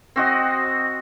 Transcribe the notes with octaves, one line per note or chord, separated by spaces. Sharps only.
C4 F#4 D#5